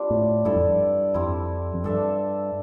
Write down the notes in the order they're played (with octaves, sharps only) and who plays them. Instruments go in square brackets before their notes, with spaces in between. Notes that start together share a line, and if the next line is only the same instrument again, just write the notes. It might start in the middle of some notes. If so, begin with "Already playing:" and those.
Already playing: [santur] G3 C4 D4 F4 G4
[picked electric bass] A2
[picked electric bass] G2 [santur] E4 A4 D5
[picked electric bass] F2
G2
[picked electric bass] F2 [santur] G3 C4 E4
[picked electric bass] F2
[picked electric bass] G2 [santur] D4 A4 E5